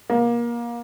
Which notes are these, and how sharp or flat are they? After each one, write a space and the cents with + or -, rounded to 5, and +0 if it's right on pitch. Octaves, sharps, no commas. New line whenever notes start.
A#3 +25